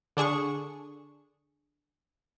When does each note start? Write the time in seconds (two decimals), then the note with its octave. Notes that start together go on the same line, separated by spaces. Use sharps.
0.17 D3 D4 G#4 C#6